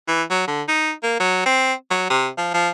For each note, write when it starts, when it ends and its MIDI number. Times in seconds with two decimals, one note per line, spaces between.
0.08 0.23 52
0.31 0.46 54
0.48 0.63 50
0.69 0.92 63
1.03 1.18 58
1.20 1.41 54
1.46 1.74 60
1.91 2.08 54
2.10 2.28 48
2.38 2.49 53
2.54 2.70 53